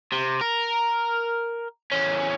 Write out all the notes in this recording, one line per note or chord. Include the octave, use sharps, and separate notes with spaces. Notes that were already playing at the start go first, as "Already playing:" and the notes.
C3
A#4
E2 C#4